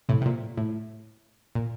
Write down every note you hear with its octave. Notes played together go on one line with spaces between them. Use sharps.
A2 C3
C3
A#2
A2
A#2